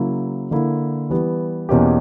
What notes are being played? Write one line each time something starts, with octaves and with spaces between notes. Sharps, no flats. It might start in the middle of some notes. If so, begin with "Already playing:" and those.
Already playing: C#3 F#3 A#3 E4
D3 A#3 E4
E3 G3 B3
E2 B2 A#3 C#4 G4